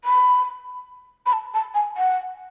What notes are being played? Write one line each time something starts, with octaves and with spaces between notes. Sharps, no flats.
B5
B5
A5
A5
G#5
F#5